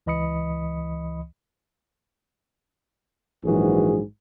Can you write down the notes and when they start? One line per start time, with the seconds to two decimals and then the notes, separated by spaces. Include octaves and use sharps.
0.06 C#2 E3 D#5 B5 D#6 C#7
3.44 A#1 G#2 E3 F#3 F#4 G#4